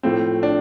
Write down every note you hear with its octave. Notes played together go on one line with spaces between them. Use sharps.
A2 F3 A3 C4
D4